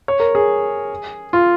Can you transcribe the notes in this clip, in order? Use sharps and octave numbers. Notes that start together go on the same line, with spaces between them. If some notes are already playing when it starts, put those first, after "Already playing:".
C#5
A#4
G#4
F4